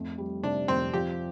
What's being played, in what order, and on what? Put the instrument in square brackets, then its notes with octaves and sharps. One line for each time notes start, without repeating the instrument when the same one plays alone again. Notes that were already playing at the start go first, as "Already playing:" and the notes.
Already playing: [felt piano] F2 A3
G3
[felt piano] C3 [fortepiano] D4
[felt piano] F2 [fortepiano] C4
[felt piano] F3 [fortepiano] G4